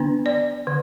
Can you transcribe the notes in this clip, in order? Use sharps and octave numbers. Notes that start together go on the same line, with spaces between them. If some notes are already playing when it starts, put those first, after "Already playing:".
Already playing: D3 B3 D4
D5
D3